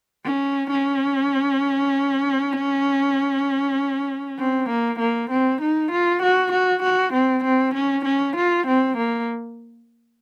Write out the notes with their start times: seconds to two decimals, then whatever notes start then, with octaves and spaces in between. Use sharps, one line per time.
0.25 C#4
0.71 C#4
4.39 C4
4.70 A#3
4.99 A#3
5.31 C4
5.61 D#4
5.92 F4
6.23 F#4
6.53 F#4
6.83 F#4
7.14 C4
7.44 C4
7.75 C#4
8.05 C#4
8.37 F4
8.67 C4
8.98 A#3